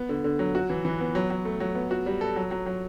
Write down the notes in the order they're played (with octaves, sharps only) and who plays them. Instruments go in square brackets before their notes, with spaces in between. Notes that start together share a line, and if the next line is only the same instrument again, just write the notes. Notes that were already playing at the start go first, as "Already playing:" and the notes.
Already playing: [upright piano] B3
D3
D3
F#3
F#4
E3
E3
B3
F#3
F#3
A3
F#3
B3
F#4
G3
A4
F#3
F#3
F#3